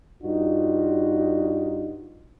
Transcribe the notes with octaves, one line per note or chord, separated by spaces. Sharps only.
G2 D#4 F4 F#4